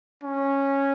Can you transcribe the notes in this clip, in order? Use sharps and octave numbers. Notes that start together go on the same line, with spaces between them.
C#4